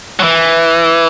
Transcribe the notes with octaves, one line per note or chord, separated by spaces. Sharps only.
F#3
E3